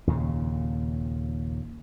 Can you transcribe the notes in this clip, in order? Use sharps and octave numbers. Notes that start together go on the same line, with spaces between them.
D#2 A#2 C#3